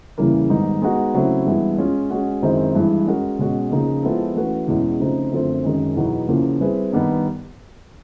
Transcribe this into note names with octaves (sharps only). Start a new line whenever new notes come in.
E2 C#3 E3 G3 A#3
G#2 D#3 G3 B3 D#4
G#3 B3 D#4 F#4
C#3 F#3 A3 C4 E4
G2 E3 G#3 B3 E4
G#3 C#4 F4
G#3 C#4 F#4
F#2 D#3 G#3 C4 E4
G2 E3 G#3
G#3 C#4 F#4 A#4
B2 G#3 C#4 F#4
C#3 F3 A#3 D#4 G#4
F3 G#3 B3 E4 A4
E3 A3 C#4 F#4 B4
E2 B2 G#3 C#4
C#3 F3 A3 C4 D#4
F#2 D3 F3 A3 C4
F#2 D#3 G#3 C#4
E2 B2 F#3 B3 D#4
E2 C#3 F3 A#3
G3 C4 E4 G#4 B4
G2 D#3 G3 B3 D#4